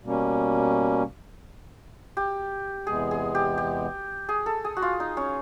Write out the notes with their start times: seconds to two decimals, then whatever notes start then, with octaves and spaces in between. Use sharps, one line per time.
0.04 B2 G3 A#3 C#4
2.17 G4
2.87 E2 C3 E3 G#3 B3 G#4
3.11 G#4
3.35 G4
3.58 G4
4.29 G#4
4.46 A4
4.64 G#4
4.77 F#4
4.82 F4
5.00 D#4
5.17 C#4